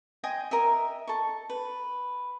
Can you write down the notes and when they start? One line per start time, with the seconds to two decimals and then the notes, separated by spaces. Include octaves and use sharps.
0.24 D#5 G5 G#5 C6
0.51 A#4 D#5 E5
1.07 A4 C#6
1.50 B4